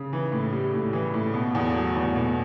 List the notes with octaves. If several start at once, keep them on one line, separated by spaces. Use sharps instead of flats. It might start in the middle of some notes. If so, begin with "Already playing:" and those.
Already playing: C#3
E3
A2
G3
A2
E3
A2
B2
E2
F#3
E2
B2